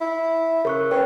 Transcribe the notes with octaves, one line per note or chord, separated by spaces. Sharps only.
E4
C#3 A#4 C#6 F#6
C#4 B4 G5 C#6